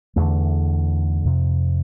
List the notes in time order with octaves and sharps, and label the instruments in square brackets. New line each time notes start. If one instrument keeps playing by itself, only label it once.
[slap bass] E2 D3 A3
F2 C3